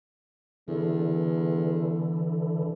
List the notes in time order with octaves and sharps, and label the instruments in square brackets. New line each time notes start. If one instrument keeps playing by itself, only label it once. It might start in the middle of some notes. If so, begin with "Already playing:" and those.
[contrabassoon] E2 [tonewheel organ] D3 E3